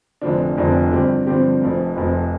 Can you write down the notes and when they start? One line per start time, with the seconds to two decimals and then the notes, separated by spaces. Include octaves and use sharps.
0.21 F1 F2 D3 F3 D4
0.57 F1 F2 D3 F3 D4
0.91 G2 D3 F3 C4 G4
1.26 G2 D3 F3 C4 G4
1.61 F1 F2 F3
1.96 F1 F2 F3